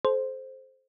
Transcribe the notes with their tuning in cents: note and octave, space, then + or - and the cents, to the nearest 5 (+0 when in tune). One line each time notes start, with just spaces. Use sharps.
A4 -35 C5 +0